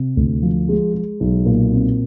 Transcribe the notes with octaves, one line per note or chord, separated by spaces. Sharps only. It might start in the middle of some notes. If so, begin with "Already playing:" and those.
Already playing: C3
D2
F3
G#3
G#3
B1
A#2
C4